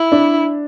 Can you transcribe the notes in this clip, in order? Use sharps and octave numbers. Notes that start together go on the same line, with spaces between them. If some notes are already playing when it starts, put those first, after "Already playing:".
Already playing: E4
D4